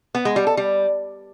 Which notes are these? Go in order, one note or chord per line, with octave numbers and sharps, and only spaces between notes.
B3
G#3
G3
A4
G3